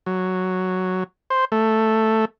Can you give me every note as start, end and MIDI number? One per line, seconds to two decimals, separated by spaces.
0.06 1.04 54
1.30 1.45 72
1.52 2.25 57